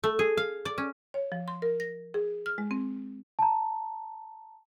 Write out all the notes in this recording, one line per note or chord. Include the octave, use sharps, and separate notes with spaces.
A3
G#4
F5
D5
C#4
C#5
F3
C6
A#4
A#6
G#4
F6
G#3
C4
A5 A#5